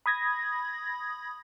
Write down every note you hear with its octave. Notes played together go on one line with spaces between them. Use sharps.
B5 D#6 G#6 A#6